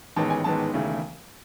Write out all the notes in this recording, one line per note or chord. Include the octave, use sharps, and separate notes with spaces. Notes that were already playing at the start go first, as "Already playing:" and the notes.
A1 G#2 D#3 G#3 B3 A5
G#5
A1 G#2 D#3 G#3 B3 A5
E1 D#2 C#3 E3 A3